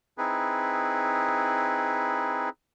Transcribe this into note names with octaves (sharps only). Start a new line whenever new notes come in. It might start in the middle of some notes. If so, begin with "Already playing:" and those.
C4 D#4 E4 G#4 B4